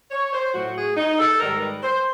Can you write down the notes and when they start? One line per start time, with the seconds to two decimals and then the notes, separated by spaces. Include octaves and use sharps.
0.11 C#5
0.33 C5
0.54 A2 F#3 F#4
0.76 G#4
0.97 D#4
1.19 A4
1.40 G#2 D#3 G3 A#4
1.61 B4
1.83 C5